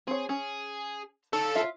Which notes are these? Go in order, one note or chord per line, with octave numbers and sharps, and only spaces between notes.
C4 G#4 C#5
C#4 G#4
D#4 A4 C#5 F5
F4 E5